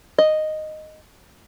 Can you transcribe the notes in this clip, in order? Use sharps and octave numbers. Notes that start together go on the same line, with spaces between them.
D#5